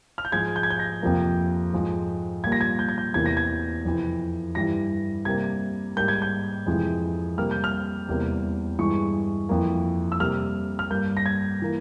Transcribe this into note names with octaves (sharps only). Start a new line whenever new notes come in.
F6
G6
G#2 F3 G#3 G#6
G6
G#6
G6
A#6
F2 C3 F3 A#3
G#2 F3 G#3
A#2 G3 A#3 G#6
A#6
G#6
G6
G#6
G6
E2 C3 E3 A#3 G#6
A#6
G#6
F2 C3 E3
G2 E3 G3 A#6
C3 G3 A#3 G#6
G#2 G3 A#3 G6
G#6
G6
F2 C3 E3 G#3
C3 G3 A#3 F6
G6
F6
E2 C3 G3 A#3
G2 E3 G#3 C#6
F2 E3 A#3
E6
C3 G3 A#3 F6
F6
G2 G3 A#3 G6
A#6
G#6
E3 A#3